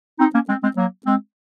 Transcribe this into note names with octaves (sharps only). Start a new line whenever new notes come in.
C4 D#4
A#3 C#4
G#3 C4
G#3 C4
F#3 A#3
G#3 C4